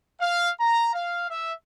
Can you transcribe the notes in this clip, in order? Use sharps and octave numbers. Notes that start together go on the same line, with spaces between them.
F5
A#5
F5
E5